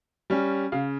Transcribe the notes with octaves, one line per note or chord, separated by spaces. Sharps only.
G3 C#4
C#3 F5